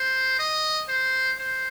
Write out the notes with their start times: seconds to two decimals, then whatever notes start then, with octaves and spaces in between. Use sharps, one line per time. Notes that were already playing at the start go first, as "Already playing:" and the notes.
Already playing: C5
0.39 D#5
0.88 C5
1.39 C5